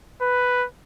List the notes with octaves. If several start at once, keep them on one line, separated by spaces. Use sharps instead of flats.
B4